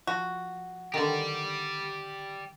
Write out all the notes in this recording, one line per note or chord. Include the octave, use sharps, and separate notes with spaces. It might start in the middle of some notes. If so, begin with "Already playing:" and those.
F3 F#4
D3 D#3 G4 D5